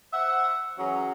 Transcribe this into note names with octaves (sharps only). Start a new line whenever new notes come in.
C5 E5 F#5
E3 F#3 C#4 G#4 A#5